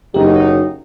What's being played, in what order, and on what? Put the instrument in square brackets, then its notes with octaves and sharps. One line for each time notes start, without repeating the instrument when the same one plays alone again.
[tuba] F#1 [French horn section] C#3 F#3 D#4 [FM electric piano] G4